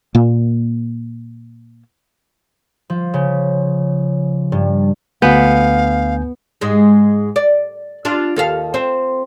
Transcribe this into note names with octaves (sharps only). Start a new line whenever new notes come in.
A#2 A#3
F3
C#3
G2
D2 B3 F5 G#5 G6
G#2 G#3
D5
D4 F4
D#2 A4 F5
C4 C5